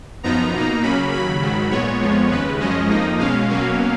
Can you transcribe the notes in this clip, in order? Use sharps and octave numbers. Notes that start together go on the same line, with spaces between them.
F#2 F3 B3 D#4 A#5
B2 A#3 D#4
C#3 F#3 A#3 C#4 B5
D#2 C#3 F#3 B5
G#2 D#3 F#3
A#2 G#3 B3 C#5
F2 F3 G#3 B3
D#2 C#3 G#3 B4
F#2 F3 G#3 C#4 D#5
F2 F3 A#3 D#4
B2 G#3 C#4 F5
B2 F#3 A#3 C#4